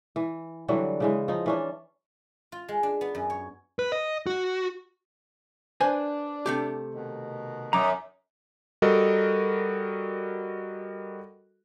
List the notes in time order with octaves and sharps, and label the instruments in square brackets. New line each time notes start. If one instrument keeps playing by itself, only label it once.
[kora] E3
D3 E3 F#3 G3
C#3 E3 G#3
F3 D#4
E3 C#4 D4
[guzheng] F4
G#3
D4
B3
F#2
C#5
[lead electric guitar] B4
D#5
F#4
[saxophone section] D4 [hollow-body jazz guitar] B4 C5 G#5
[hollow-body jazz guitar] C3 A3 G4
[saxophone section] B2 D#3
[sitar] F#2 [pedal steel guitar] A#5 D6 D#6
[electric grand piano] G3 F#4 A4 A#4 D#5